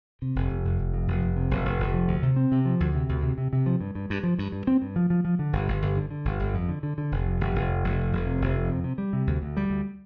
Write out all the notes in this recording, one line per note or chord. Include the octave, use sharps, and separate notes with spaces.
C3
F1
F1
F1
F1
F2
F1
F1
C3
F1
F1
F1
F3
D2
C3
C4
C3
F3
D2
C3
D2
C3
C3
C3
F3
G2
G2
G2
F3
G2
G2
C4
G2
F3
F3
F3
D3
G1
G1
G1
D3
D3
G1
G1
F2
D3
D3
D3
F1
F2
F1
F1
F2
F1
F2
F1
C3
F1
F2
C3
C3
G3
C3
D2
D2
G3
D2